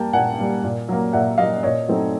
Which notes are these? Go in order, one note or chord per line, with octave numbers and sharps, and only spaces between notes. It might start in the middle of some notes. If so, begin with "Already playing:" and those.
Already playing: G3 A#3 G5 A5
A#2 F#5 G#5
G3 A#3
A#2
F#3 A#3
A#2 E5 F#5
F#3 A#3 D#5 F5
A#2 C#5 D#5
F#3 A3 C4 D#4